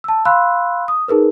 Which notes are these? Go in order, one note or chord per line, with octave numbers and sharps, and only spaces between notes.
A5 E6
F5 B5 C6 E6 F#6
D#6
D#4 G#4 A#4 B4